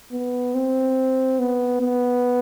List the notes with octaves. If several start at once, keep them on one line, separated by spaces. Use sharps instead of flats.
B3
C4
B3
B3